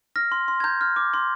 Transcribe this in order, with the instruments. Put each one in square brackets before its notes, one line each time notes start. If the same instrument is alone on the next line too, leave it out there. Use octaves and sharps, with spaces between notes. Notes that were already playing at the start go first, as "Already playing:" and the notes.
[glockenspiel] F6 A#6
C6
C6
G#6
A#5 G6
F6
D6
C6